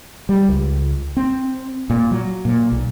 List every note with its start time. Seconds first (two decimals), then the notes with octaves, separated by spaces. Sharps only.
0.29 G3
0.48 C#2
1.17 C4
1.90 A#2
2.11 F#3
2.45 A#2
2.72 B1